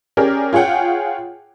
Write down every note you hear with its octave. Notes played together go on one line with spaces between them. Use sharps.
C#4 G4 G#4 A#4 D5
F4 G#4 C#5 F#5 G5